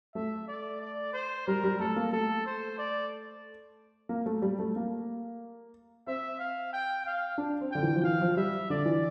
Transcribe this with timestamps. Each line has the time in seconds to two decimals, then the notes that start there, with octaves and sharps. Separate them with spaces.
0.15 A3 E5
0.48 D5
0.81 D5
1.13 C5
1.47 G3 A#4
1.64 G3
1.80 A3 A4
1.96 A#3
2.12 A3 A4
2.46 C5
2.78 D5
4.09 A#3
4.26 A3
4.42 G3
4.59 A3
4.76 A#3
6.07 C4 E5
6.39 F5
6.73 G5
7.06 F5
7.38 D4
7.61 C4
7.72 D3 G5
7.83 E3
7.95 F3
8.03 E3 F5
8.21 F3
8.36 G3 E5
8.70 D3 D5
8.86 E3